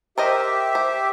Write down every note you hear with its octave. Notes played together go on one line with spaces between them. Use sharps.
G4 A#4 C5 D#5 E5
C5